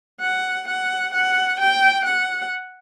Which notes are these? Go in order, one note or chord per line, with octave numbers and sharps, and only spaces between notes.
F#5
F#5
F#5
G5
F#5